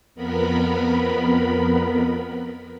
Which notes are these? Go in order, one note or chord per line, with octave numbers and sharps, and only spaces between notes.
F2 B3 A#4 B5